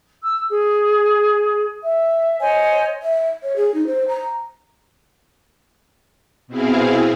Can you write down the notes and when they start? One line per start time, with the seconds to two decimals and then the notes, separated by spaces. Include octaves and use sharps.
0.22 E6
0.48 G#4
1.83 E5
2.40 C5 C#5 D#5 G#5
3.02 E5
3.43 C#5
3.56 G#4
3.74 D#4
3.87 C5
4.08 A#5
6.47 B2 C4 E4 G#4 F5